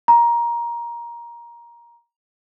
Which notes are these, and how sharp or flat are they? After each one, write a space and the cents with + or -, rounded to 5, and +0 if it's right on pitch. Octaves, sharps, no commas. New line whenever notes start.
A#5 +15